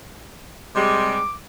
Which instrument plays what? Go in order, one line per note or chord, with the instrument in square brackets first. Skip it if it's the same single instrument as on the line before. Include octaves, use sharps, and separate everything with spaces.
[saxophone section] C3 G3 G#3 [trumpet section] D6